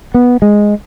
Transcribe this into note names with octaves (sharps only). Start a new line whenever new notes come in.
B3
G#3